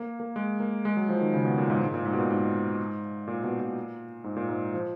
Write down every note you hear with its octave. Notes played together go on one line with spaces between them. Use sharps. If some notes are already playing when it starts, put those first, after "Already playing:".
Already playing: A#3
A#3
G#3
A#3
G#3
F#3
F3
D#3
C#3
B2
A#2
G#2
G#2
A#2
G#2
B2
A#2
G#2
A#2
B2
A#2
G#2
A#2
G#2
F3